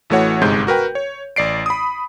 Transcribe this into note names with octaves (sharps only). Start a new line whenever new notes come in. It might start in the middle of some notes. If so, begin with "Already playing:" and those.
A1 E3 A3 F#4 C#5 F#5
G1 G#2 C3 G#3 G6
F#4 A#4 B4 G5
C#5
A1 D5 C7 D7
B5 D#6